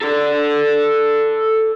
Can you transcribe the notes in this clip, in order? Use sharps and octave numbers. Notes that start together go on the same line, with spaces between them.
A4 D5